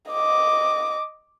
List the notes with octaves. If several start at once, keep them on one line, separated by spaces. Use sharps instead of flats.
D#5 D6